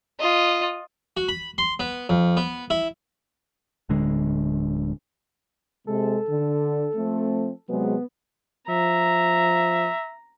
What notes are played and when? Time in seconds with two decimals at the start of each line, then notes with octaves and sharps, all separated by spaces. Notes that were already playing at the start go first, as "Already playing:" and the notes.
0.19 F4 D#5
1.17 F#4
1.29 B5
1.58 C6
1.80 B3
2.09 F2
2.37 B3
2.70 E4
3.89 D1 D3 G#3
5.87 C3 G#3 A4
6.29 D3
6.95 F3 A3 C4
7.69 C3 F#3 G#3 B3
8.69 F3 E5 A#5